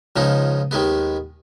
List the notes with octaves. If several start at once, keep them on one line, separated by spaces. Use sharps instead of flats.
C#2 C#3 F3 G#3 D#4
D#2 D#3 G#3 B3